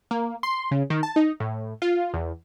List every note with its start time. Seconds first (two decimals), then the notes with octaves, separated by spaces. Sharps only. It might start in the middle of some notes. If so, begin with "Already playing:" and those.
0.11 A#3
0.43 C6
0.71 C#3
0.90 D#3
1.03 A5
1.16 D#4
1.40 A2
1.82 F4
2.14 E2